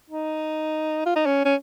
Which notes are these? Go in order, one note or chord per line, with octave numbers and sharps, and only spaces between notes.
D#4
F4
D#4
C#4
C#4